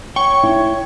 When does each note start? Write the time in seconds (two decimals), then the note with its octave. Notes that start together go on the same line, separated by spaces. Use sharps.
0.16 C#5 G5 C#6
0.43 E4